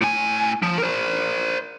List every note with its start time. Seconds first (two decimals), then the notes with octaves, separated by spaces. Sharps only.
0.01 A2 G#5
0.62 F3
0.78 A#4 C5